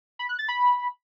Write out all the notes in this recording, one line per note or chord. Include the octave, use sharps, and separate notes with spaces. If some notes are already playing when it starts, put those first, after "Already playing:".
B5
F#6
A6
B5